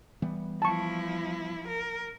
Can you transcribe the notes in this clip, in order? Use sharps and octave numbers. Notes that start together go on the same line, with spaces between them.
E3 G3 B3
F3 E4 A5 C#6
A#4